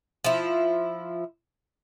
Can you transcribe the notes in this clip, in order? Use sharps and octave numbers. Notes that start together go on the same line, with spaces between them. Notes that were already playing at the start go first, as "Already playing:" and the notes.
F3 E4